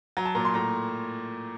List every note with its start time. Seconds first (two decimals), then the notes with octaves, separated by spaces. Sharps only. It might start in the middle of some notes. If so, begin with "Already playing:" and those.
0.17 F#3 A#5
0.25 A5
0.35 A#2 A#5
0.45 C6
0.54 A2 A#5